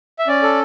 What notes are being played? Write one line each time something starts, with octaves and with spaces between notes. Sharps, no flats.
E5
C#4 D5
A4